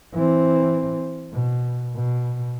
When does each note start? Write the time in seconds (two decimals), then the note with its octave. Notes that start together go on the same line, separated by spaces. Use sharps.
0.14 E3 C4
1.33 B2
1.96 B2